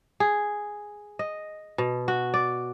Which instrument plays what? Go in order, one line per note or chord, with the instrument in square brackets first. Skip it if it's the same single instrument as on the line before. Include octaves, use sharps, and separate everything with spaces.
[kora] G#4
D#5
B2
F#4
D5